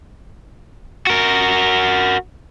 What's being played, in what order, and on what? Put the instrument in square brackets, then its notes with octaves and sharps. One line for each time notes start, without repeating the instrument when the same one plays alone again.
[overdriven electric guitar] F#4 A#4